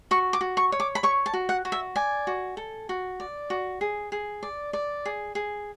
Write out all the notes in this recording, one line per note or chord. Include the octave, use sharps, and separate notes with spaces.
F#4 C#6
D6
F#4
C#6
C#5
D6
B5
C#5 C#6
A5
F#4
F#5
F#4
E5
D5 G#5
F#4
A4
F#4
D5
F#4
G#4
G#4
D5
D5
G#4
G#4